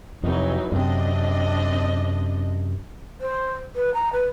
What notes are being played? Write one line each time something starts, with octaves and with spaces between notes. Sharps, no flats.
F2 C3 E3 F#3 D#4
F#2 C3 C4 D4 D#5
C5
B4
A#5
B4